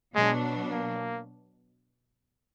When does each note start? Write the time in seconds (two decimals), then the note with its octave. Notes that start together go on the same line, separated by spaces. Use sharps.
0.15 B2 F#3 G#3 D4
0.70 A#3